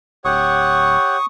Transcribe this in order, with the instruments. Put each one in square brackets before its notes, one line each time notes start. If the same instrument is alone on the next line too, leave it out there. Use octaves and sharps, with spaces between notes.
[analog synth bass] D1 [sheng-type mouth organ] G4 C#5 F#5 [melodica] C#6 D#6